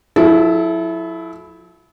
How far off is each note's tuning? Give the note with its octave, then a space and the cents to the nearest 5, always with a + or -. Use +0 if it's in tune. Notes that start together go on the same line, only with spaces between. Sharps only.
F3 +40 E4 +0 A4 -40